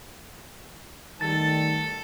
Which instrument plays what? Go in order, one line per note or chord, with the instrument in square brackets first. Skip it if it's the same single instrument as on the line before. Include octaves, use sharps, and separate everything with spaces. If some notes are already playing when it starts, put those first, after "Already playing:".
[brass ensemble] D#3 G3 A3 [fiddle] A4 [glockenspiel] A6